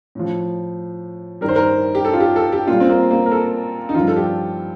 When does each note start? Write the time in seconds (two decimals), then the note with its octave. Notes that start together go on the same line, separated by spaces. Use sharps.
0.15 A2 F3
1.41 G2 D#3 G3 A#4
1.48 C5
1.56 A#4
1.95 G4
2.05 A4
2.13 F4
2.20 G4
2.36 A4
2.52 G4
2.67 A#2 G3 F4
2.80 C4
2.89 A#3
3.11 A#3
3.26 A#4
3.31 A4
3.89 D#4
3.95 G2 D3 F3 F4
4.08 A4
4.16 G4